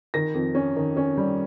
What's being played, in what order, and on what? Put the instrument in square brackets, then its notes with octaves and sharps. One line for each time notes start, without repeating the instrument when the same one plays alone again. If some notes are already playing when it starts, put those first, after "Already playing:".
[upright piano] D#3 A#6
F2
C#4
D#3
C#4
G3